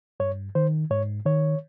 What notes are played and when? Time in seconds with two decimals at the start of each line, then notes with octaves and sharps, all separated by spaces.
0.20 G2 C#5
0.55 D#3 C5
0.90 G#2 C#5
1.26 D#3 C#5